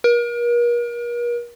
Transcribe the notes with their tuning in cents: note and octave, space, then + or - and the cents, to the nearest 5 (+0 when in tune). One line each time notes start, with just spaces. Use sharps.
A#4 +40